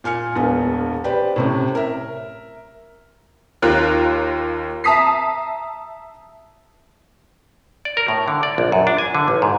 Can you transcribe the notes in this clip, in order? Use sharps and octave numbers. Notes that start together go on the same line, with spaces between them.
A#2 G#5 F6 C#7
E1 A#1 B3
G4 B4 C5 D5
A2 C3 C#4
A#4 E5
D#2 F4 A#4 F#6
E5 A5 A#5 D#6 B6 C7
D5
A#4
A2
D3
D5
A#1
F#2
D4
G#5
D3
A1
G#2